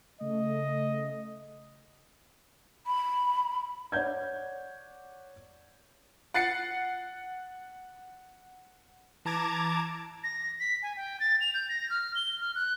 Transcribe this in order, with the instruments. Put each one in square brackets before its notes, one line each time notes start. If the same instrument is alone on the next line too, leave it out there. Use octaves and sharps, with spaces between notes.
[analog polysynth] C#3 A3 [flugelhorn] D#5
[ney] B5
[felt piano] C#5 D5 F#5 G6 G#6
[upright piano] F#5 A6 C7 C#7
[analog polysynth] E3 A5 A#5 D6 G#6 A6
[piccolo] A#6
B6
G#5
G5
A6
F7
G6
A#6
F6
G7
F6
F#6